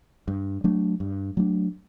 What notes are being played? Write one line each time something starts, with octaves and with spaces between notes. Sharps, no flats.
G2
F#3 A3 D4
G2
F#3 A3 D4